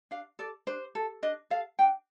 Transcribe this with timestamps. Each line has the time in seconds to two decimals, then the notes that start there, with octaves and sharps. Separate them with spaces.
0.11 D4 F5
0.39 A4 D5
0.67 D4 C5
0.95 A4
1.23 D4 D#5
1.50 A4 F5
1.79 D4 G5